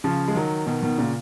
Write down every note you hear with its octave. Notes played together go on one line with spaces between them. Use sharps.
C#3 F3
G#3
D#3 F#3
B2 D#3
B2 D#3
A#2 C#3